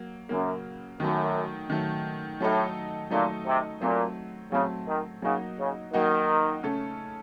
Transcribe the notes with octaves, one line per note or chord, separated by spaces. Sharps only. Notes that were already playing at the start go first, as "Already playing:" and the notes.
Already playing: F#3 A#3
F#2 C#3 F#3 A#3
F#2 D#3 F#3 A3
D#3 F#3 A3
A2 F#3 A3 D#4 A4
A#2 F#3 A3 D#4 A4
C3
A#2 F#3 A3 C4
C#3 F#3 A3 C4
D#3
C#3 F#3 A#3 D#4 F#4
C#3
D#3 F#3 A#3 D#4 F#4
C#3 A3 C#4 A4